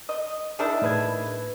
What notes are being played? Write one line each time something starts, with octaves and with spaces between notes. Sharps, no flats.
D#5
D#3 D4 E4 G#4
A2 B4 G#6